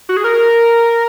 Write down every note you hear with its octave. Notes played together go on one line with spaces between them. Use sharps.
F#4
G#4
A#4